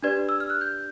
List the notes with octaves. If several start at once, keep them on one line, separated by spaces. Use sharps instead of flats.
D4 G4 B4 D5 G#6
E6
F6
F#6
G6